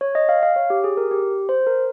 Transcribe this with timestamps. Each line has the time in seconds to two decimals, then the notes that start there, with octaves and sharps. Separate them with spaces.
0.01 C#5
0.15 D#5
0.29 F5
0.43 F5
0.56 C#5
0.70 G4
0.84 G#4
0.97 A#4
1.11 G4
1.49 C5
1.66 A#4